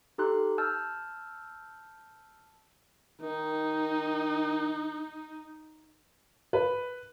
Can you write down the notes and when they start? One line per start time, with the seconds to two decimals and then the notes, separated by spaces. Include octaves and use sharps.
0.18 D#4 G4 A4 C6 F#6
0.58 A5 E6 F6 G6
3.22 D#3 D#4
6.53 B4